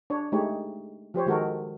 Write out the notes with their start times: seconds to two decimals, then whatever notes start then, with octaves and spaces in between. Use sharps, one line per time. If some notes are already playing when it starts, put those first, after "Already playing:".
0.10 D4 C#5
0.32 G#3 A3 D#4 G4 C#5
1.14 F3 G4 C5 C#5
1.26 D#3 G#3 F#4 A4 A#4